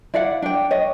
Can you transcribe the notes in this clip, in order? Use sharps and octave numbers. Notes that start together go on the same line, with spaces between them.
E4 D5 F5 F#5
D4 G5
C#5 D#5